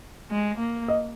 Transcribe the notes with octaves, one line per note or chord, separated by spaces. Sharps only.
G#3
A#3
D#5